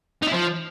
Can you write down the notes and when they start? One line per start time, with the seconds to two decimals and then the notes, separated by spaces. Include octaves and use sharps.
0.22 D#4
0.27 E4
0.32 F3